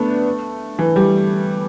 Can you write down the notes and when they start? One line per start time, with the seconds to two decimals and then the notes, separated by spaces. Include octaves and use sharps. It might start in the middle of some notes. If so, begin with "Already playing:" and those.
Already playing: A3 B3 D4
0.79 E3
0.96 G3